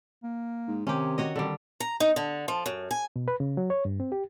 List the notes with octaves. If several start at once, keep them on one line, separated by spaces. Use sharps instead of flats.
A#3
G#2
C3 D#3 C#4 G4
F#4 C#5 D#5
C2 D3 D#3 G3
A#5
D#4
D3
F3
F#2
G#5
B2
B4
C#3
F#3
C#5
G2
C4
G4